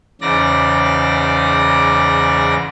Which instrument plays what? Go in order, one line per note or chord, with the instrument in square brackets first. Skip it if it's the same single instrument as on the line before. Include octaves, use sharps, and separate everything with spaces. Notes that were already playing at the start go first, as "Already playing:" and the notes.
[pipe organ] E2 G#2 C#3 D5 A#6